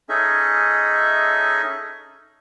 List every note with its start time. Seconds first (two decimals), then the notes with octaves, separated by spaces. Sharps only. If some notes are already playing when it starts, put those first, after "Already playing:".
0.09 C#4 D#4 G#4 A4 D#5 E5